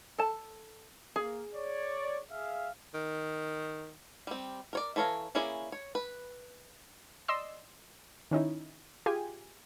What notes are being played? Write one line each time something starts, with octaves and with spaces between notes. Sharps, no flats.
A4 A5
A#3 G#4
C#5 D5
G#4 E5 F5
D#3
G3 C4
A#4 C#5 D5
E3 A4 C#5 F5 A#5
A#3 C#4 E4 G#4 D5
C#5
B4
D5 D#5 C6 E6
D#3 C#4 D#4 E4
F4 G4 G#4 G#5